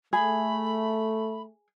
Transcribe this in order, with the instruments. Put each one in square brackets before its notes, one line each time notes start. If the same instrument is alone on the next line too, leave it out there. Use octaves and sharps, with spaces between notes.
[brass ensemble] A3 [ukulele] G#4 [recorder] B5